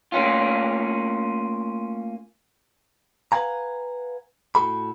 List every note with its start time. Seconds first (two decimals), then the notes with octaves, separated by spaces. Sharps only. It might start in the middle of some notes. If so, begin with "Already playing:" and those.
0.12 A3 A#3 C#4 F4
3.32 B4 F5 F#5 G#5 A#5
4.55 A2 F#4 A4 B5